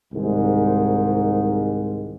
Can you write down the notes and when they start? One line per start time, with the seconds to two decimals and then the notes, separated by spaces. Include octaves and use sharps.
0.13 C2 G#2 D#3